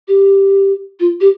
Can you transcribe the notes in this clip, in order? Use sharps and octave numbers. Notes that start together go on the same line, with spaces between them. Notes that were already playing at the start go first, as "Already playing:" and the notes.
G4
F4
G4